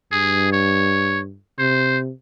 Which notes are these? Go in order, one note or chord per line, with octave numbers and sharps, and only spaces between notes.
G2 G#4
C#5
C3 C5